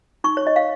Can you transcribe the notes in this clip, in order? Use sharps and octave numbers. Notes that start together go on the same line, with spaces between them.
D#4 C#6
C#5
D#4 D#5
F5